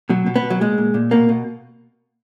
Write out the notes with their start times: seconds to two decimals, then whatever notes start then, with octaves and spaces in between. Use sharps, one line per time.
0.10 B2 F#3
0.26 B2
0.36 B3
0.44 B2
0.50 F#3
0.61 A#2 G#3
0.78 A#2
0.94 A#2
1.11 B2 A#3
1.29 B2